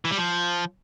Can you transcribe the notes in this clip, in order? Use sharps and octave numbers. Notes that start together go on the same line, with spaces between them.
E3
G3
F3